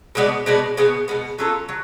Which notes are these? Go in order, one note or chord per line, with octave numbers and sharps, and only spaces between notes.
B2 G#3 B3 D4
B2 G#3 B3 D4
B2 G#3 B3
B2 G#3 B3
F#3 C#4 F4 A4
F#3